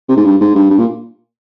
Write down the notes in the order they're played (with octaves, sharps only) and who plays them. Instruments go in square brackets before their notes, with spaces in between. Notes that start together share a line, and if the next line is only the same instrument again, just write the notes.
[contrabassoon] C3
G#2
G2
G#2
G2
G2
A#2